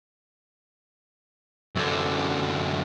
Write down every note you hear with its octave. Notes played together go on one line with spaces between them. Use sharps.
F#2 D3